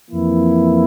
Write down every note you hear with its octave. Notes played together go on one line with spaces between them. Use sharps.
F2 E3 A#3 E4